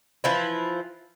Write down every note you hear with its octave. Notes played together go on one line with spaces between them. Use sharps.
E3 F3 E4